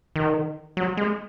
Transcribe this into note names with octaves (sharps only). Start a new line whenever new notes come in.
D#3
F#3
G#3